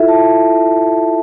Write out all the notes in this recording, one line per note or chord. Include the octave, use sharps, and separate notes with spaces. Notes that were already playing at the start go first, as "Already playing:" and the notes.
Already playing: E4 F4 A4 E5
A5